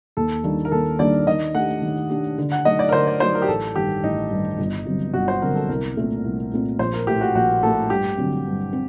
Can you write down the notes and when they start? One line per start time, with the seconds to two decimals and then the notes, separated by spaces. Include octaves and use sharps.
0.17 D#2 A4
0.44 D#3 G3 A#3 D4
0.65 A#4
0.72 D#2 A4
0.99 D#3 G3 A#3 D4 D5
1.27 D#3 D#5
1.55 A3 D4 G4 F#5
1.82 D#3
2.10 A3 D4 G4
2.38 D3
2.52 F#5
2.65 F#3 A3 D#4 F#4 D#5
2.79 D5
2.89 A#4
2.92 D3 C5
3.07 D5
3.20 F#3 A3 D#4 F#4 C5
3.35 A#4
3.42 G4
3.48 A1 A4
3.76 G2 D#3 G4
4.03 A1 D#4
4.31 G2 D#3
4.59 G1
4.86 G2 D3 F#3 C4
5.14 G1 F#4
5.28 C5
5.42 G2 D3 F#3 C4 A#4
5.55 A4
5.69 C2 A#4
5.97 A#2 A3 C4
6.24 C2
6.52 A#2 A3 C4
6.79 A#1 C5
6.94 A#4
7.07 A2 A3 G4
7.21 F#4
7.35 A#1 F#4
7.63 A2 A3 A4
7.90 G2 G4
8.18 D3 F#3 C4
8.46 G2
8.73 C4